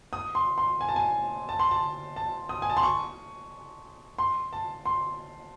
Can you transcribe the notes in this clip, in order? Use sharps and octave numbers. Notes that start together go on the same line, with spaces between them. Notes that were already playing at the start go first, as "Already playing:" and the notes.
D#6
C6
C6
G#5
A5
G#5
A5
C6
A5
A5
D#6
G#5
A5
C6
C#6
C6
A5
C6